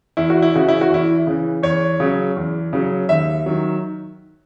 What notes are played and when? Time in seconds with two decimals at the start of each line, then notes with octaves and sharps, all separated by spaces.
0.17 E2 E4
0.30 F#4
0.42 E4
0.54 C#3 E3 F#4
0.68 E4
0.81 F#4
0.90 E2 E4
1.27 C#3 E3
1.63 E2 C#5
2.00 C#3 F#3
2.36 E2
2.73 C#3 F#3
3.09 D#2 E5
3.46 D#3 F#3